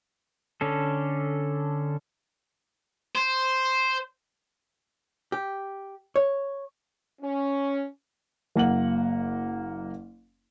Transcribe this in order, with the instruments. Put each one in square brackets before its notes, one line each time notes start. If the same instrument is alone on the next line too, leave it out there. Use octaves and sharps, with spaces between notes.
[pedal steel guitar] D3 C#4 A4
[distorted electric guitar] C5
[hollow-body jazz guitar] G4
C#5
[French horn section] C#4
[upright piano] F#1 A#3 F#5 F#7